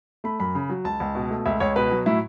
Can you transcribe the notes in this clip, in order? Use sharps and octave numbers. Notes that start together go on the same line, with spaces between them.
A3 B5
F#2 B5
C#3
F#3
C#2 A5
C#2
B2
A3
C#2 E5
C#2 C#5
B2 B4
F#3
A2 E4